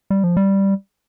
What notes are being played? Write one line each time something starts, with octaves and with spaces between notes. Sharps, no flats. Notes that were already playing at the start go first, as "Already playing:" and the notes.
G3
F3
G3